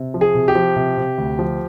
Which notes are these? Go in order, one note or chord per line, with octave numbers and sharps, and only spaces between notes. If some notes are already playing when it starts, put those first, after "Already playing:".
Already playing: C3
F3
G#4
C3
G4
F3
C3
C3
D2
F3